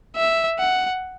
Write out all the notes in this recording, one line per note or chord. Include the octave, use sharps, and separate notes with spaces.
E5
F#5